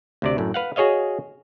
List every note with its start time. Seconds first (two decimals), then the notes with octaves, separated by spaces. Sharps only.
0.22 D2 C3 D5
0.38 F#2 A2
0.54 B4 F5 F#5
0.76 F#4 G#4 C#5 D#5 F5